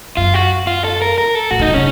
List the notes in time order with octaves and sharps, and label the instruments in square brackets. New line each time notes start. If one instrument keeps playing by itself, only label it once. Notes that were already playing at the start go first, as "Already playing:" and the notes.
[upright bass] F#2 [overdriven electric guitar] F4
[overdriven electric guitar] F#4
F4
A4
A#4
A#4
A4
[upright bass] A2 [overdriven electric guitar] F#4
[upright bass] D#3 [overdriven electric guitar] D#4
[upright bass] F3
[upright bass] C#3 [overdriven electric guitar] C#4